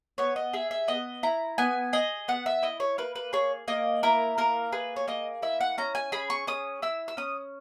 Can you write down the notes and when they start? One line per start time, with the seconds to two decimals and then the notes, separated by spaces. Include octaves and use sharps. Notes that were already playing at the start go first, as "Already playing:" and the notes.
0.18 B3 C#5
0.36 D#5
0.53 G#4 E5
0.71 E5
0.88 B3 D#5
1.23 E4 A#5
1.58 B3 G#5
1.93 G#4 D#5
2.28 B3 F#5
2.46 E5
2.63 E4 D#5
2.80 C#5
2.98 A#3 B4
3.16 B4
3.33 G#4 C#5
3.68 A#3 D#5
4.03 E4 A#4
4.38 A#3 A#4
4.72 G#4 B4
4.96 C#5
5.08 A#3 D#5
5.42 E4 E5
5.61 F#5
5.78 C#4 A#5
5.95 G#5
6.12 G#4 B5
6.30 C#6
6.47 C#4 D#6
6.82 E4 E6
7.08 E6
7.17 C#4 D#6